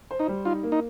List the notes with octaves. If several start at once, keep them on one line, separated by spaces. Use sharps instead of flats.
C5
D#4
G3
D#4 F4
A#3
D#4